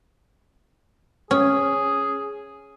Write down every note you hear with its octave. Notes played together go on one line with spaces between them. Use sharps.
C#4 G#4